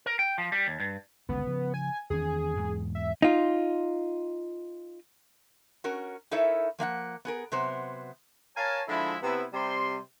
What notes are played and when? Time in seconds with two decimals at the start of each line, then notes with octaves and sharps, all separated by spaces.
0.06 A#4
0.19 G5
0.38 F3
0.52 G3
0.67 D#2
0.80 G2
1.29 G1 C#2 F#2 B3
1.47 C#3 F3
1.74 G#5
2.10 E2 D#3 C#4 G#4
2.57 E2 G#2
2.95 E5
3.22 D#4 F4
5.84 C#4 F#4 A#4
6.31 D#4 E4 A4 A#4 C#5 E5
6.79 F3 A#3 F5 F#5
7.25 B3 G#4 A#4
7.52 C3 F#3 B3 C5
8.57 A#4 C#5 F5 G#5 A5
8.88 D3 F3 G#3 E4
9.23 C3 B3 E4
9.54 C3 G3 C6